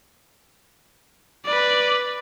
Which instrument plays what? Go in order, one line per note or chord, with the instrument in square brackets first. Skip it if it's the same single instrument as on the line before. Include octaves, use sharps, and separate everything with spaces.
[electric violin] B4 D5